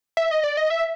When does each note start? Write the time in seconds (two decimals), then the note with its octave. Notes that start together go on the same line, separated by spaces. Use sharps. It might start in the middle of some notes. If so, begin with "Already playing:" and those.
0.17 E5
0.31 D#5
0.44 D5
0.57 D#5
0.70 E5